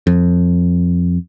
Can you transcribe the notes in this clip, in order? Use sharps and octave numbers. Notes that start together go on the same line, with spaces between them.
F2